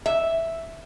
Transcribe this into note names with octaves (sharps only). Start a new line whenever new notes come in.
E5